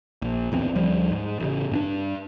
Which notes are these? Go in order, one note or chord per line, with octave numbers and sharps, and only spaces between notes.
A#1
D1 E2 C4
D2 F3 G3
G#2
A1 C#3
G2 C#4 D4